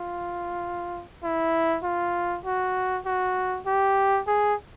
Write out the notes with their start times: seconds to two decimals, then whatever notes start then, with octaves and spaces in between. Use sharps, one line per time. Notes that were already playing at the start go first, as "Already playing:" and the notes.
Already playing: F4
1.23 E4
1.83 F4
2.45 F#4
3.05 F#4
3.66 G4
4.27 G#4